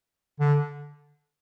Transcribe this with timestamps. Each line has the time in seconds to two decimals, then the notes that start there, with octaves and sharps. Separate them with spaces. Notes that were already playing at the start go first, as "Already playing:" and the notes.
0.40 D3